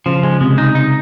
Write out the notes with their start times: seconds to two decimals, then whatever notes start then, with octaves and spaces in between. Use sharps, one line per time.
0.06 C#3 F3
0.23 C#3 G#3
0.41 C3 G#3
0.58 D#4
0.75 D#4